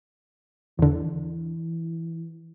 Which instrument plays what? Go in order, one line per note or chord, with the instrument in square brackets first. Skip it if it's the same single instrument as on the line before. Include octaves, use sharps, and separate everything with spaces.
[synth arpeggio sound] E2 D3 [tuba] E3